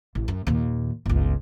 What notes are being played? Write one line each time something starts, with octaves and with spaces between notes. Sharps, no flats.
A1
F#2
D#2 A#2
G1 C#2